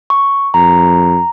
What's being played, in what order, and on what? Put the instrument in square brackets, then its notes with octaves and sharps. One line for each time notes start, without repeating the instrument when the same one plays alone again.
[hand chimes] C#6
[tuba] F2 [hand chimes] A#5